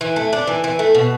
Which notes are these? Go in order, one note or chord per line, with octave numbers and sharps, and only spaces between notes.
E3
A3
D4
E3
E3
A3
B2